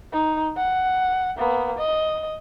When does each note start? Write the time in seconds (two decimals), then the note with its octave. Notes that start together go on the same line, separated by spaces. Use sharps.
0.13 D#4
0.57 F#5
1.37 A#3 B3
1.79 D#5